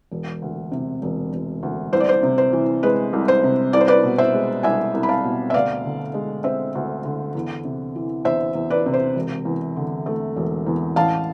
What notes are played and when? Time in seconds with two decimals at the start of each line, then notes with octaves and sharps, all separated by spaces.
0.12 E1
0.42 D2
0.72 C3
1.02 E1
1.33 E1
1.63 D2
1.93 C2 C5
2.00 D5
2.09 C5
2.23 C3
2.38 C5
2.53 E3
2.83 G#3 B4
3.13 C2
3.28 C5
3.44 C3
3.73 C2 D5
3.81 C5
3.88 B4 D5
4.04 B2
4.18 C5 E5
4.33 G#3
4.63 C2 E5 G#5
4.94 C2
5.03 B5
5.09 F5 A5
5.24 B2
5.50 E5
5.54 D2 D5 F5
5.84 D3
6.14 G#3
6.44 C4 C5 E5
6.75 D2
7.05 D3
7.35 E2
7.65 C3
7.95 E3
8.25 E2 C5 E5
8.55 E2
8.70 B4 D5
8.86 C3
8.94 C5
9.16 E1
9.45 E2
9.76 D3
10.06 A3
10.36 E1
10.66 E2
10.96 A1 F5 A5